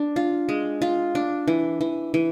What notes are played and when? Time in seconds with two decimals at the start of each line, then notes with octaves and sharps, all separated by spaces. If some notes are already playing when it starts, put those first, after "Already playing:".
Already playing: D4
0.16 F4
0.49 G#3
0.82 F4
1.15 D4
1.48 E3
1.81 E3
2.14 E3